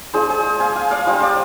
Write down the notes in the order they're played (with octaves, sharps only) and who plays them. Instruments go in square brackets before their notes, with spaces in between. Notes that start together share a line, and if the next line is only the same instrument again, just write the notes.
[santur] G#3 D4 F4 G#4 C5
G#4 C5
F5 G#5
F5 G#5
D5 F5
G3 D4 F4 C5 D#5
D5 F5